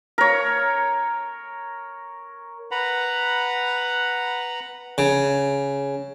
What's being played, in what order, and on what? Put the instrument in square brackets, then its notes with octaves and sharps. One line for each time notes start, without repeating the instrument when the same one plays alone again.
[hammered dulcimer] A#4 C#5
[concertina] B4 F#5 A#5 B5
[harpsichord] C#3